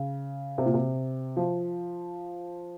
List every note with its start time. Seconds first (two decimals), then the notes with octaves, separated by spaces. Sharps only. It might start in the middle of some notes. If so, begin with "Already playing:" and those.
Already playing: C#3
0.58 C3
0.66 A#2
0.74 C3
1.37 F3